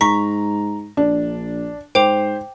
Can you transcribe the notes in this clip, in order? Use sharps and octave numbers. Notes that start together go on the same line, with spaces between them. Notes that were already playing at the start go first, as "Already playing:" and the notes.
G#2 A#5 C#6 B6
A#1 D4
G#2 C5 G5 D6 F7